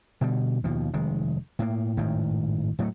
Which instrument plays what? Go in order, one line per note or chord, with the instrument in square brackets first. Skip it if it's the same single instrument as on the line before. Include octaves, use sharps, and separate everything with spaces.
[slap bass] B2 D3 G3
D#2 B2 F3
F1 D#3 G#3
A2 A#3
G#1 F#2 A2 D#3
A2 F#3 G3 A3